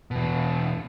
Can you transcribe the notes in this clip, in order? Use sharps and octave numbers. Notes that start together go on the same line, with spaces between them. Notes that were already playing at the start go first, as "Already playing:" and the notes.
E2 B2